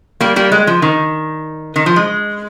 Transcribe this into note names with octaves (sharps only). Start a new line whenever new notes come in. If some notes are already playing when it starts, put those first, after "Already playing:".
G3 A#3
G3 A#3
G#3
F3
D#3
D#3
F3
G#3